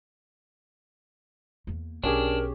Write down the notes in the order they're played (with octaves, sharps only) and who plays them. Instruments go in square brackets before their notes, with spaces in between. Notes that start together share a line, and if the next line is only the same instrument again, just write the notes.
[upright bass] E2 A#3
[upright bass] B1 [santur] C#4 G4 G#4 [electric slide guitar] D4 [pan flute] A#4